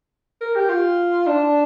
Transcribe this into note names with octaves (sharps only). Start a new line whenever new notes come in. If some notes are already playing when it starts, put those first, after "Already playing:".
A#4
G4
F4
D4